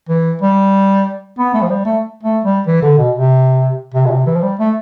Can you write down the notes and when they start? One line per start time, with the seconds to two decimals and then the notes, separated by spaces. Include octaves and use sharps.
0.09 E3
0.41 G3
1.39 B3
1.54 A3
1.62 F3
1.71 G3
1.86 A3
2.23 A3
2.45 G3
2.67 E3
2.82 D3
2.98 B2
3.15 C3
3.94 C3
4.06 B2
4.11 C3
4.27 E3
4.36 F3
4.43 G3
4.59 A3